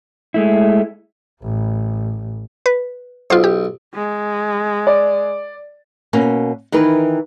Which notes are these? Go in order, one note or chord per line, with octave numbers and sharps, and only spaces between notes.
G#3 A3 E4
A1
B4
B1 F4 C5
G4
G#3
D5
B2 A#3 C#4
D#3 E3 E4 A#4 B4